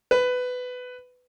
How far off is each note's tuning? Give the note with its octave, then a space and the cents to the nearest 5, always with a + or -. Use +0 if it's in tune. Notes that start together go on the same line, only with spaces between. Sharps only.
B4 +15